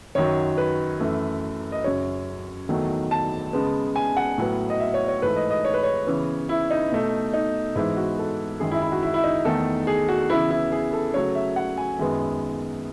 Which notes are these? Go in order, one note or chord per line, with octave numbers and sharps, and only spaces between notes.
F#2 D#3 F#3 C#5
B4
F#2 E3 A3
D#5
F#2 C#3 F#3 C#5
E2 D#3 F#3 A3
A5
C#3 G#3 B3
G#5
F#5
A2 F#3 B3
D#5
E5
C#5
C#5
G#2 E3 A3 B4
D#5
D#5
C#5
B4
C#5
C#3 E3 B3
E4
D#4
B2 A3
D#4
G#2 E3 G#3 B3 E4
F#4
A4
F#2 D#3 G#3 G#4
E4
E4
F#4
E4
E4
D#4
E2 D#3 A3 A4
G#4
F#4
C#3 E3 B3 E4
E4
G#4
A4
C#3 F#3 A3 C#5
E5
F#5
G#5
F#2 D#3 G#3 B3